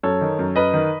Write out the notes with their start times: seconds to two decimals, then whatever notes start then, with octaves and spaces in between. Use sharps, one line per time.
0.03 F#2 A4 C#5
0.21 D#3
0.39 F#2
0.56 F#2 B4 D#5
0.74 D#3